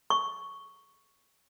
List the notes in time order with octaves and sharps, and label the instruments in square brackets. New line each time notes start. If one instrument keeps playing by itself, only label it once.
[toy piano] C#6